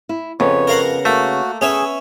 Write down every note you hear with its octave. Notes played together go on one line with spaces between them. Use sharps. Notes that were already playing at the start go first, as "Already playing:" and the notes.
E4
F2 C#3 B3 C#5
A#4 F5 F#5
A3 A#3 F#4
B3 C#4 G#4 C#5 E5